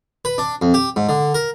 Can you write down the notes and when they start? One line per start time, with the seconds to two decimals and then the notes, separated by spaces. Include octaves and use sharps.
0.25 B4
0.38 D4
0.62 F2
0.74 G4
0.96 G#2
1.09 D3
1.34 A#4